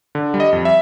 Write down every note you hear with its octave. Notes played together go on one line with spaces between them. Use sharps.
D3
G3
D#5
F2
E5